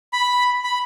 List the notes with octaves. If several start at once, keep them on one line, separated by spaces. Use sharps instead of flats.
B5
B5